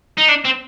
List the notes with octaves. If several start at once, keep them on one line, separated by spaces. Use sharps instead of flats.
D#4
D4
C4